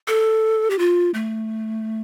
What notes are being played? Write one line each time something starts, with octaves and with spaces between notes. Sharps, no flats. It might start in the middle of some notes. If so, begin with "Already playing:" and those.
A4
G4
F4
A3